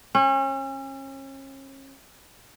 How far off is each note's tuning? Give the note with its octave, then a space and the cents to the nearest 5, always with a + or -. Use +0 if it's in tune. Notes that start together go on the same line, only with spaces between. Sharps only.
C#4 -35